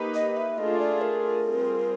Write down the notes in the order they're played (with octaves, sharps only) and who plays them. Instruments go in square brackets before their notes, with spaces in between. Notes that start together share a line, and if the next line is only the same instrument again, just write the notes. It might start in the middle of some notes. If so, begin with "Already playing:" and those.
Already playing: [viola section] A#3 D#4 G4 B4
[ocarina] D#5
E5
[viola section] A3 D4 F4 G#4 [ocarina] D#5
[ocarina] D5
A#4
[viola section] G3 C4 F4 G#4